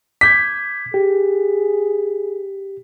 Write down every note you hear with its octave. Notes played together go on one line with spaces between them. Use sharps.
D6 G6 G#6 B6
G4 G#4